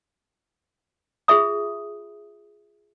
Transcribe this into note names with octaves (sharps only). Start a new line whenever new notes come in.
F4 G#4 E5 B5 D#6